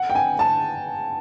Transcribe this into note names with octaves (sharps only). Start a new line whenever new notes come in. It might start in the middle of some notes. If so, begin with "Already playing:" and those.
Already playing: F#5
G5
G#5
A5